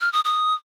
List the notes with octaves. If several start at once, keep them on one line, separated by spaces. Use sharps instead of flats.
F6
D#6
D#6